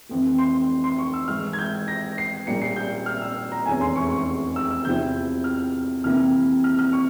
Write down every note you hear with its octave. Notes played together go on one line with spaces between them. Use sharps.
F1 F2 E3
C6
C6
C#6
E6
G#2 E3 G#3 F6
G#6
G6
A#6
C7
A#1 A#2 G3 A#3 C#4 C#7
C7
G6
F6
E6
A#5
F1 E2 E3 G#3 C#4 G#5
C6
C#6
C#6
E6
E6
E2 C3 F3 C4 E4 G6
F6
F2 C3 E3 A#3 E4 F6
F6
F6
C#6